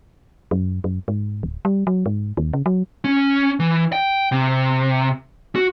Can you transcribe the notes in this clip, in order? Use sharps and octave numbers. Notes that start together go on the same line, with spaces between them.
F#2
F#2
G#2
D1
G3
F#3
G#2
D#2
C#3
F#3
C#4
E3
G5
C3
F#4